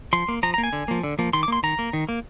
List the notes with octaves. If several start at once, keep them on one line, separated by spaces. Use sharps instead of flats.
F3 C6
A#3
F3 A#5
A#5
A#3
G#5
D3
F3 A#3
D3
F3 A#3
D#3 C6
D6
A#3 C6
D#3 A#5
A#3
D#3
A#3